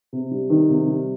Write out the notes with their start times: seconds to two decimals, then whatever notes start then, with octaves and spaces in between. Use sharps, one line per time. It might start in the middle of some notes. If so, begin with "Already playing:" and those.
0.13 C3
0.31 G3
0.50 D#3
0.69 C3
0.87 G3